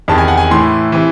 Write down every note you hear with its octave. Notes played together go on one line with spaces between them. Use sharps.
E2 C3 D#3 A5
G#5
F#5
G#5
A2 E3 C6
C3 E3